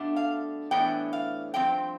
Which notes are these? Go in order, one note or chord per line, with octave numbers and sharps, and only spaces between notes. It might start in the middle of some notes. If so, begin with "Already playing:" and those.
Already playing: B2 A3 D4
F5
A2 E3 B3 D4 G5
F5
G2 F3 C4 G5